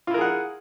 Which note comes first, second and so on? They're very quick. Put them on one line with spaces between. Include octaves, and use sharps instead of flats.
F4 E4 A#4 G#4 F#5